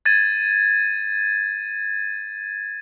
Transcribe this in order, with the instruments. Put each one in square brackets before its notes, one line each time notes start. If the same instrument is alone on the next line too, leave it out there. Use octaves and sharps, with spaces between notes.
[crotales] G#6 A6 D#7